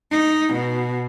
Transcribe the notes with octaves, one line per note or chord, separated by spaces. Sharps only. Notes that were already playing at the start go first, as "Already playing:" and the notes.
D#4
B2